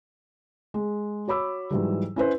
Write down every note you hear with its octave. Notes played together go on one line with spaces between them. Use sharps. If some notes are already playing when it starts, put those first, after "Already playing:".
G#3
F#4 C#5 B5 D6 E6
G#2 E3 F#3 G3
C#4 E4 B4 C5